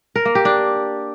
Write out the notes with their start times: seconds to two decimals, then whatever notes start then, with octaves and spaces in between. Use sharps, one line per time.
0.16 A#4
0.25 A#3
0.35 G4
0.45 D4